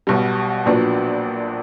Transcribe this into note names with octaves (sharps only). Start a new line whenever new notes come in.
B1 B2 G3
A#1 A#2 F#3 B3 D4